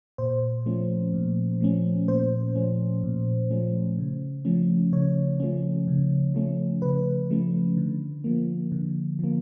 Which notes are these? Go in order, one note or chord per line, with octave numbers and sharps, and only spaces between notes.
A#2 C5
F3 A3 C#4
A#2
F3 A3 C#4
A#2 C5
F3 A3 C#4
A#2
F3 A3 C#4
C#3
F3 A3 C#4
C#3 C#5
F3 A3 C#4
C#3
F3 A3 C#4
C#3 B4
F3 A3 C#4
D3
F3 A#3
D3
F3 A#3